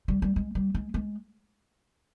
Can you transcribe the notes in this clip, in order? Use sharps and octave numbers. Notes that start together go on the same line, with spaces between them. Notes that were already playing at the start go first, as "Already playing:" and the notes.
G3
G3
G#3
G3
G#3
G#3